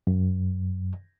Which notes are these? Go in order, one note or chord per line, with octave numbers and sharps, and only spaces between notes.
F#2